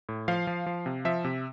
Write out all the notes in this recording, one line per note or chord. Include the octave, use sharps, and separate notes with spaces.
A2
F3 F5
F3
F3
C3
F3 E5
C3